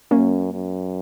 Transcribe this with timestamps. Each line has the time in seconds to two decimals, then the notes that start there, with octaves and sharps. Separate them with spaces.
0.11 F#2 A#3 C#4
0.53 F#2